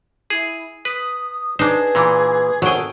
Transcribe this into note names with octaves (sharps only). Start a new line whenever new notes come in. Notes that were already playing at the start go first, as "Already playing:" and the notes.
E4 G#4
B4 D#6
D4 D#4 G#4 B4 C5
A#2 E3
G#1 F#3 G#4 A4 G5